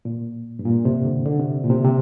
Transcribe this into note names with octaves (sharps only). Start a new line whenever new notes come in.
A#2
G2
A#2
C3
D3
D3
C3
A#2
C3
C3